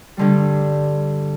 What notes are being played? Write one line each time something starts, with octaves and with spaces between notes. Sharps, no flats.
G2 D3 G3